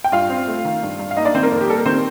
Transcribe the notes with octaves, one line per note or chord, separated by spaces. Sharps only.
G5
G2 F4 F5
C4
A3
D#3
G2
G2
F5
A#3 D#4 D#5
D4 D5
D#3 C4 C5
A#3 A#4
F2
G4
G3 A4
A#4
D#3 C4 C5